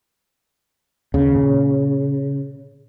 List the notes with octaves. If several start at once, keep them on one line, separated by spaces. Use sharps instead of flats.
D#2 C#3
A#2